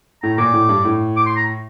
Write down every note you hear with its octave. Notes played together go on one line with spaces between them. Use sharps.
A2 A#5
A#2 D6
A2
G2
A2
D6
C6
A#5